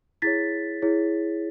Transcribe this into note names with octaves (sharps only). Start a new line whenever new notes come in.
E4 G#4 C#5 A6 B6
E4 G#4 C#5